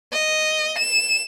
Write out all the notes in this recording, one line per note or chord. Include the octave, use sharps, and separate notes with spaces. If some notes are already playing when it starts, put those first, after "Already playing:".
D#5
E7